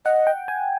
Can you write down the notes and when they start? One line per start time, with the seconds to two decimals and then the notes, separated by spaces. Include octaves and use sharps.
0.05 D#5 F#5
0.27 G5
0.48 G#5